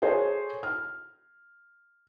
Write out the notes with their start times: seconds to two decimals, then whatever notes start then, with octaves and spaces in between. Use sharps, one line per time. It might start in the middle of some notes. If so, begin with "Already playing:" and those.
0.02 G#4 A4 C5 C#5
0.63 F6